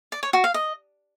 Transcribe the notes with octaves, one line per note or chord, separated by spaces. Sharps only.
D5
C#5
F#4
F5
D#5